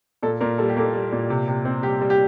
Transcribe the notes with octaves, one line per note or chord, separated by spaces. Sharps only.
A#2 A4
A#2 A#4
G3 A4
G4
A#3 A4
G3
A#2
C3
C3
C4
G3 G4
G3
G4